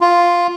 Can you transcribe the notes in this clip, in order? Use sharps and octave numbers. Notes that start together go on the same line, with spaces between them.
F4